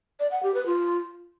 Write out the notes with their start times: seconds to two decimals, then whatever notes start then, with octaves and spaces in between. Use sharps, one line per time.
0.20 D5
0.31 F#5
0.43 G4
0.54 B4
0.66 F4